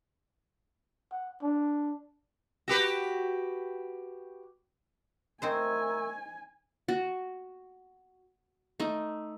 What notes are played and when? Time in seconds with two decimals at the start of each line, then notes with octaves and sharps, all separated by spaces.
1.12 F#5
1.42 D4
2.68 F#4 G4 B4
5.42 A3 C4 D#4 A#4 C5 G#5
6.88 F#4
8.80 A3 D#4